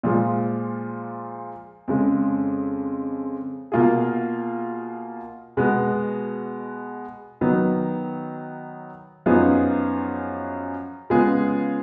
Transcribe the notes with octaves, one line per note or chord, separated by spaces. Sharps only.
A#2 F3 G#3
F2 C#3 G#3
B2 A#3 F4 G#4
B2 G#3 B3 F#4
D#3 F#3 B3 D#4
F#2 F3 B3 D#4 G#4
C#3 G#3 B3 F4 G#4